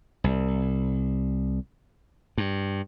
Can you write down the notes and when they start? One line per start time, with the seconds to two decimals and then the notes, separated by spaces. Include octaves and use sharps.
0.24 C2
2.38 G2